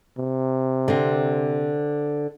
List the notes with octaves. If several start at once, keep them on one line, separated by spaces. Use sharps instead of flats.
C3
D3 C4